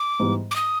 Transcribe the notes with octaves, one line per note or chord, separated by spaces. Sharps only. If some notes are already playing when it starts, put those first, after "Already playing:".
Already playing: D6
G#2 E3 G3 B3
D6
D#6